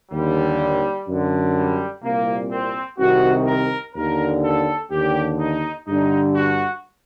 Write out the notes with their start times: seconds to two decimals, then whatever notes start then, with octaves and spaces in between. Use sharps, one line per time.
0.12 D#2 D3 G3
1.08 F#2 D3
1.56 G3
2.03 C2 A#2 A#3
2.52 C4
2.99 C2 C3 D#3 F#4
3.47 A#4
3.95 D#2 D3 A#4
4.44 A4
4.91 D#2 D3 G4
5.40 D#4
5.88 G2 D3 D#4
6.35 F#4